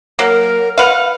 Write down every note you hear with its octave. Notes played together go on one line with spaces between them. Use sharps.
F#3 A#3 A#4
B4 F5 F#5